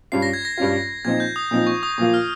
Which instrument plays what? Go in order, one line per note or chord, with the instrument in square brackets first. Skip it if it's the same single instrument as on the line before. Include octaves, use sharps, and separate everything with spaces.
[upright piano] G2 G3 C#4 F4 [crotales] C7
[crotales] A#6
G#6
A#6
[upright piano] G2 G3 C#4 F4
[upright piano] A#2 F3 C4 D#4 [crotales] G#6
[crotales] G6
D#6
[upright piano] A#2 F3 C4 D#4
[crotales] C#6
D#6
[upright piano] A#2 F3 A#3 F4 [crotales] C#6
[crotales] F6